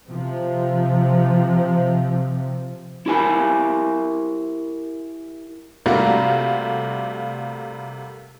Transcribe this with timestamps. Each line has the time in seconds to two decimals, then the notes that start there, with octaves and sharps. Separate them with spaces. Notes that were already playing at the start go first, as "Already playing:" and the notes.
0.11 C3 F3
3.06 E4 G4 A#4 G#5 B5
5.86 C3 G3 A3 A#3 F4 F#4